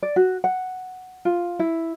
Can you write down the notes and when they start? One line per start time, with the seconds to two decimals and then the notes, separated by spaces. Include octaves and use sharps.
0.03 D5
0.16 F#4
0.44 F#5
1.25 F4
1.59 E4